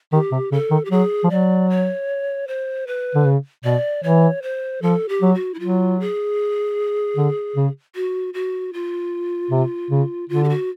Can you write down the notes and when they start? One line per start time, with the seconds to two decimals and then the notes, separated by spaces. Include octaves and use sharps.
0.13 D#3 G4
0.32 C3
0.52 C#3 A4
0.71 D#3
0.85 G4
0.91 F#3 G#4
1.24 F3
1.30 F#3 D5
1.70 C#5
2.48 C5
2.87 B4
3.15 D3
3.25 C#3
3.64 B2 D5
4.03 E3 C#5
4.42 C5
4.82 F3 A4
5.09 G4
5.22 F#3
5.34 F#4
5.54 E4
5.60 F#3 F4
6.00 G#4
7.17 D3
7.56 C#3
7.95 F#4
8.34 F#4
8.73 F4
9.51 C3
9.91 C#3
10.29 D3 F4
10.44 G4
10.49 F#4